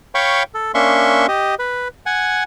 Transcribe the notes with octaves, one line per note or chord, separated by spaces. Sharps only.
C#5 F5 G5 B5 C#6
A4
A#3 C#4 D4 E5 C6 C#6
G4 D#5
B4
F#5 G#5